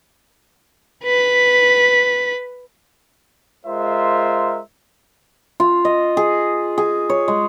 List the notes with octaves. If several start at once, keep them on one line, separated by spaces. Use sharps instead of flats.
B4 B6
G#3 F4 A#4 C5 E5
F4
D#5
G#4
G#4
C#5
G#3